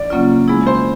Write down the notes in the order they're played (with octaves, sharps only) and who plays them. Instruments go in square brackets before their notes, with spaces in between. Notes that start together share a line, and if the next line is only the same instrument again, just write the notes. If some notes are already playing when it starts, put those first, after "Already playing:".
Already playing: [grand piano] D5
[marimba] C#3 F#3 A#3 C#4 F4
F3 G#3 B3 E4 G#4
[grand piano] C5